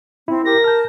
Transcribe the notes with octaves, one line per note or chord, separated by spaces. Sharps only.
C4 E4
G4 A#4 A#6
A5 F6 G6